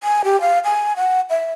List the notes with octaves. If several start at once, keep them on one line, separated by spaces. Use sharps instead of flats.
G#5
G4
F5
G#5
F#5
E5